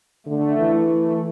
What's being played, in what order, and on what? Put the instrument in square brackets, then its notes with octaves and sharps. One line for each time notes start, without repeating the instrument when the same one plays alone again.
[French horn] D3 [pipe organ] A3
[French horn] E3
[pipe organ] A3